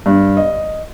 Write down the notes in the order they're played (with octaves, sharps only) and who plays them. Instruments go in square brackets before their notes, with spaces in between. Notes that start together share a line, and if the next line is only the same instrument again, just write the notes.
[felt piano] G2
D#5